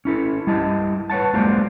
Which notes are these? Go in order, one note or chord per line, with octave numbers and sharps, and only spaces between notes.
C#4 E4 A4
G3 E4 D#5 A5
B4 C#5 F#5 A5
F#3 G#3 A#3 F4 C5 D5